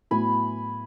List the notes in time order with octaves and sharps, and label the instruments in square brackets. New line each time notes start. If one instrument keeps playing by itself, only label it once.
[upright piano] A2 F#3 B3 E4 [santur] G#5 B5